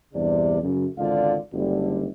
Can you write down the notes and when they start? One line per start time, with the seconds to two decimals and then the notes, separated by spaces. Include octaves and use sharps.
0.14 E2 G2 C3 D4 D5
0.62 F#2 C#3
0.97 G#1 C#2 D3 F4 D5 F5
1.53 F#1 D3 G3